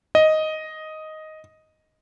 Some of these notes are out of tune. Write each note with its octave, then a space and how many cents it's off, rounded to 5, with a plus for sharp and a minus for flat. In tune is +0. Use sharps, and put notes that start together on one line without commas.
D#5 +5